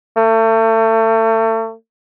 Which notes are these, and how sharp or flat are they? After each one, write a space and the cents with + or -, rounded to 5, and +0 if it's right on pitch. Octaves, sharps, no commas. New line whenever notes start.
A3 +35